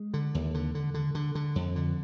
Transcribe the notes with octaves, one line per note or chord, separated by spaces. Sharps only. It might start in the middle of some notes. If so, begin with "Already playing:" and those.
Already playing: G#3
D3
D#2
D3
D3
D3
D3
D3
F2
D3